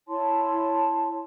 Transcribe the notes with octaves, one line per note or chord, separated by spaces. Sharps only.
E4 C#5 A5 C6